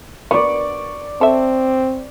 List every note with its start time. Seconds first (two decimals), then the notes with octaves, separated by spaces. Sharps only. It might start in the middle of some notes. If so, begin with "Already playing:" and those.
0.31 B3 F#4 D5 C#6
1.21 C4 A4 E5